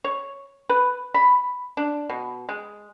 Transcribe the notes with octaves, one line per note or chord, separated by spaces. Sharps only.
C#5
B4
B5
D4
B2
G#3